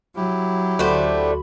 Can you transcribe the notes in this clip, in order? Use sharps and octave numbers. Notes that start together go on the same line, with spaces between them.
F#3 E4 G4
D2 A3 D4 F#4 C5 B5